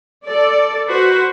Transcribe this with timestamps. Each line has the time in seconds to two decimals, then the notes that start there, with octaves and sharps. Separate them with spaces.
0.24 A4 D5
0.88 F#4 B4 C5